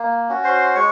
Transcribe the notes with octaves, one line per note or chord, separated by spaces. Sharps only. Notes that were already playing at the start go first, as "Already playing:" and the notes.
Already playing: A#3
C#4 F#4
C5 C6
G#3 C#5 C#6